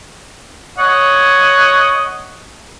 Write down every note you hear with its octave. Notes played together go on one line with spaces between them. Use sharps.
C#5 D#5 F#5